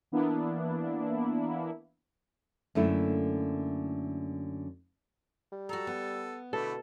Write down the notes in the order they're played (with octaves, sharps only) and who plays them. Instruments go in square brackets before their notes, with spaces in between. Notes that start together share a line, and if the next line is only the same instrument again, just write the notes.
[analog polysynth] E3 A#3 B3 D4 E4
[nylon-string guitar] F#2 D3 A3 A#3 E4
[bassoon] G3
[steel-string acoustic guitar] F#4 A#5 [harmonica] A4
[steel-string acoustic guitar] B3
[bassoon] B2 [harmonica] D3 A3 E4 [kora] A4